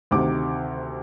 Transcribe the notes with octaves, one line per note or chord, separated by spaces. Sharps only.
D2 C3 D#3 D6